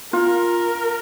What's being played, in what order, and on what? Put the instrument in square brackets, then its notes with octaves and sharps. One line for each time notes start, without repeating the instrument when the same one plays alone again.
[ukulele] F4 [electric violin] A#4